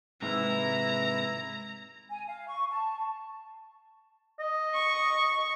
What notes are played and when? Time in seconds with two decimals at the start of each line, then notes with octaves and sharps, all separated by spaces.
0.22 G#2 C3 E3 G#3 E4 A#5
2.11 G#5
2.28 F5
2.49 C#6
2.72 A5
4.39 D#5
4.74 C#6